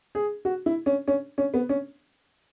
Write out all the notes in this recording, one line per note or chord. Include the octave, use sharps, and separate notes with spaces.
G#4
F#4
E4
C#4
C#4
C#4
B3
C#4